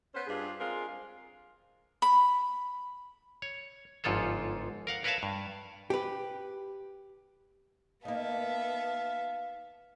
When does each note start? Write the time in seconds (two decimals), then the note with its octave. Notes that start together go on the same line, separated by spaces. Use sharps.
0.14 B3 C#4 C5
0.27 G2 D4 F4 G#4
0.58 G#3 C4 F4 G#4 A#4
2.02 B5
3.42 C#5
4.04 G1 G#2 F3 F4 A4 C#5
4.87 A#4 F5 F#5
5.04 A#4 B4 C#5 E5 F5 A5
5.23 G2
5.90 G4 B4
8.05 A#3 B3 D#4 E5 F5 A5